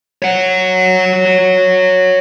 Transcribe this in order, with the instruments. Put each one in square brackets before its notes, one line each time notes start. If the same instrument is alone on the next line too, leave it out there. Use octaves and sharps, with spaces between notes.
[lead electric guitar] C#5 F#5